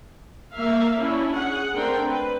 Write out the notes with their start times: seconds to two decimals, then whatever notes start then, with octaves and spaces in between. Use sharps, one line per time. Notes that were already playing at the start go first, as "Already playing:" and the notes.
0.53 A#3 E5 F5
0.98 C#4 D4 E4
1.36 G#4 F#5
1.73 A3 C4 D4 A#4 G5 C6
2.07 B4